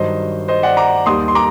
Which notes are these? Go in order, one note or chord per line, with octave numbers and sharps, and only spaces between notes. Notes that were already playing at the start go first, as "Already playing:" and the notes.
Already playing: G2 D#3 F#3 C5 D#5
C5 D#5
D5 F#5
A#5 D6
D#2 D#3 G3 C6 D#6
C6
A#5 D6